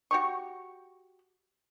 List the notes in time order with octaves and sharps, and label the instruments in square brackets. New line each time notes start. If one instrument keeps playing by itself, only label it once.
[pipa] F#4 G4 C#6